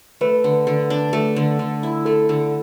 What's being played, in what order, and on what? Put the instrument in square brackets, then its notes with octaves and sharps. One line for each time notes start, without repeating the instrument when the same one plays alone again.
[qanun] A3 [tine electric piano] B4
[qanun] D3
D3
D4
A3
D3
D3
E4
[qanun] A3 [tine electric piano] A4
[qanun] D3